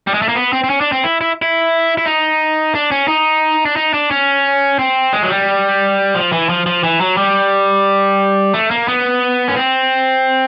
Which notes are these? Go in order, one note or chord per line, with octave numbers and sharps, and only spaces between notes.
G3
G#3
A3
A#3
B3
C4
C4
C#4
D4
C4
E4
E4
E4
E4
D#4
D4
C#4
D#4
D4
D#4
D4
C#4
C4
G#3
F#3
G3
F3
E3
F3
F3
E3
F#3
G3
A3
A#3
B3
C#4
C4